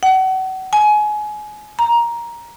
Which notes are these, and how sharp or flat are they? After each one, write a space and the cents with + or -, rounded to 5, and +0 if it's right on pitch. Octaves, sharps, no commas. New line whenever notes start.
F#5 +35
G#5 +25
A#5 +10